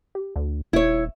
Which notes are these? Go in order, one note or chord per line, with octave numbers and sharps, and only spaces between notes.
G4
D2
D#1 E4 C#5